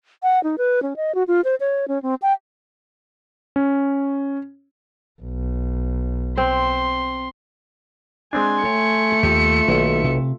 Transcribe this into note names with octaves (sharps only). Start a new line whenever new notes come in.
F#5
D#4
B4
C#4
D#5
F#4
F4
C5
C#5
C#4
C4
G5
C#4
B1
C4 C6
G#3 C4 D4 G#5 C6
A3 A4 C#5 G5 C#7
D#2 F4 G4 E5
B1 D#3 A#3
C3